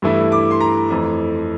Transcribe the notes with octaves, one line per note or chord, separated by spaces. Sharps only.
G2 E3 A3 E4
D6
C6
A#5
F2 E3 A3